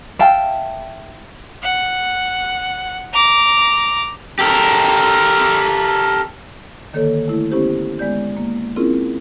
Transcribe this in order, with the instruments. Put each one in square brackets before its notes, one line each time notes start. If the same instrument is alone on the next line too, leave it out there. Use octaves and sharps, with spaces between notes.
[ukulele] E5 F5 G5 A5
[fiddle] F#5
A#5 D6
[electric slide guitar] G4 A4 A#4
[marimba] D3 D#3 A#3 A4 C#5
A3 E4
B3 C#4 E4 G4 C5
G#3 B3 D5 G6
A#3
C4 C#4 E4 F4 G#4 A#4